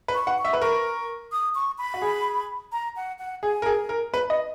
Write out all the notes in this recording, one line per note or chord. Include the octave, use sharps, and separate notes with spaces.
B4
C#6
F#5
C#6
E5
B4
A#4 C#6
D#6
C#6
B5
F#4
G#4
A#5
F#5
F#5
G#4 G#5
A#4
G#4
A#4
B4
D#5